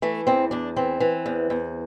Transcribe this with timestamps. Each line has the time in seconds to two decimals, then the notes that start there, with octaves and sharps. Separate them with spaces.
0.02 E3 A3
0.27 E2 C4
0.51 E2 D4
0.76 E3 C4
1.00 E3
1.26 E2
1.50 E2